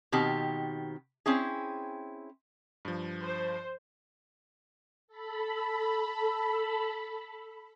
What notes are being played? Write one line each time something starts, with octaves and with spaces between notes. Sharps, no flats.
B2 D#3 C4 G4
C4 C#4 E4 G#4
G2 F3
C5
A4 B5